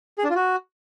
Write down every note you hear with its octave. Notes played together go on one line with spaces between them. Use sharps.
G#4
D4
F4
F#4